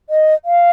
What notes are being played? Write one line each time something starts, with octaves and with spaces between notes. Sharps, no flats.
D#5
F5